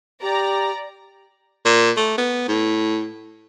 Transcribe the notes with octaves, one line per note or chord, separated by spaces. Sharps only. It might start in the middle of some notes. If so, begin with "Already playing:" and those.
G4 D5 A#5
A#2
A3
B3
A2